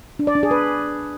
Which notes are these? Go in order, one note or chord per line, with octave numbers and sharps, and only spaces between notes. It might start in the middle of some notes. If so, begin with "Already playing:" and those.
D4
D5
D4
G#4
B4